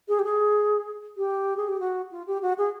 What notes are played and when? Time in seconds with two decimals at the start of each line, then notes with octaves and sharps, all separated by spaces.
0.08 G#4
0.19 G4
0.24 G#4
1.17 G4
1.57 G#4
1.68 G4
1.80 F#4
2.12 F4
2.27 G4
2.42 F#4
2.58 G#4